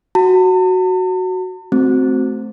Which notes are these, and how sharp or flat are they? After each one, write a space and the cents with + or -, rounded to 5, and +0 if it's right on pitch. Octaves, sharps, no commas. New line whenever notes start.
F#4 +0 A5 +45
A3 -15 C4 +0 F#4 +0